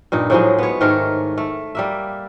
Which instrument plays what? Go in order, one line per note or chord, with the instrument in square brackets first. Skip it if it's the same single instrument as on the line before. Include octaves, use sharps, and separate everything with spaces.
[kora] G2 A#2 D#4
A2 F3 F#3 G#3
B3 C#5
G#2 D#3 A3 A#4
A3
G3 A#3 E5